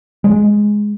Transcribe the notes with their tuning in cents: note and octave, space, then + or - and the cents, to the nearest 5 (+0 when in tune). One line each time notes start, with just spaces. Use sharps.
G#3 +0